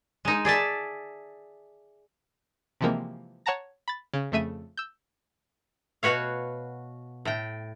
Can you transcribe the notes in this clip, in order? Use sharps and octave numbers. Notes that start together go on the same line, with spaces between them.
G#3 D#4
G#4 D5 E5 A5
C3 E3 F3 G#3 A#3 C4
C#5 F#5 A5 A#5 A#6
B5 A6
C#3
F2 C#3 A3 E5 D#7
E6 G6
B2 F#4 B4 C#5 F5
A2 G5